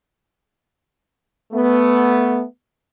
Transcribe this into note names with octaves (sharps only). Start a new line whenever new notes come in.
A3 B3